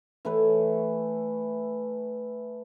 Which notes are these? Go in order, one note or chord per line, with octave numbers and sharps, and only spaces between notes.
E3 A3 B4 C#5